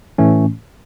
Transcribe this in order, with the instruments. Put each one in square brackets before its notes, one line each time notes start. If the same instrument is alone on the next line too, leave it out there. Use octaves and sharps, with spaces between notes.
[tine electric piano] A2 E3 A3 C#4